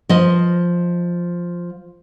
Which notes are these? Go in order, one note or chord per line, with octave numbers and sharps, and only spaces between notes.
F3 D#5